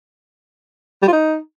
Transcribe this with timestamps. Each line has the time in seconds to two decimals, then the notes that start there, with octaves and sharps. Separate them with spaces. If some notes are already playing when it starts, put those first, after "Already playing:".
1.02 G3
1.08 F4
1.13 D#4